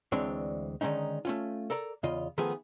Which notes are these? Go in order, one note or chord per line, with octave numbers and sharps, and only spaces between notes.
D2 E3 G#3 C4 D4 C#5
D3 D#3 G#3 C#4 D#4
A3 C#4 F4
A4 A#4 D5 A#5
E2 C#3 F4 D#5
D#3 F3 A3 B3 G#4